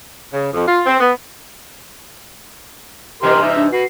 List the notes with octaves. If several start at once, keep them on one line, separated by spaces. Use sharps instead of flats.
C#3
F2
F4
C4
B3
G2 C3 E3 G4 A#4 C6 F6
D#4 E5
D4
F#4 B4 C7